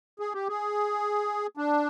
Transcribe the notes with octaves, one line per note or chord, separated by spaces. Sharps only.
G#4
G4
G#4
D4